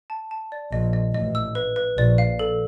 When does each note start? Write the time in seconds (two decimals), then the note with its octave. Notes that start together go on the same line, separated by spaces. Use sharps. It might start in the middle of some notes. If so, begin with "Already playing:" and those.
0.10 A5
0.31 A5
0.52 D5
0.72 A#1 A#2 D#5
0.93 D#5
1.14 A1 A2 D#5
1.35 E6
1.55 B4
1.76 B4
1.98 A#1 A#2 D5
2.18 F5
2.39 A4